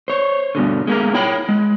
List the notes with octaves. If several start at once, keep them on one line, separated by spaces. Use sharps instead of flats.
C5 C#5
G2 B2 D3
G#3 A#3 A#4
E4 C#5 G5 B5
G#3